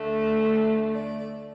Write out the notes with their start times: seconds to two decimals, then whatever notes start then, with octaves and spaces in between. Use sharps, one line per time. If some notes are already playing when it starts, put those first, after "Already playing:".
Already playing: D2 D3 A3
0.93 D5